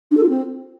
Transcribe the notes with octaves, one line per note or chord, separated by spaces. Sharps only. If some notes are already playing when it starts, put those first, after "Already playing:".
D4
A4
F4
C4